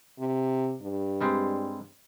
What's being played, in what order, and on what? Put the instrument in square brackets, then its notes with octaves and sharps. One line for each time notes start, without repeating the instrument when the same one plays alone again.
[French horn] C3
G2
[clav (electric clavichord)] G3 G#3 C4